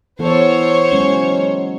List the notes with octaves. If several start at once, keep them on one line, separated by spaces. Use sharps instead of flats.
E3 B3 A4 C5 C#5
F#3 G#3 C#4